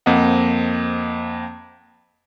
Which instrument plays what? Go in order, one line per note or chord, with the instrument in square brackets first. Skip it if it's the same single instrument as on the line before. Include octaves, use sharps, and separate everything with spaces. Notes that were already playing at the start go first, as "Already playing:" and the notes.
[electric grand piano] F2 A#3 C4 D#5 F#5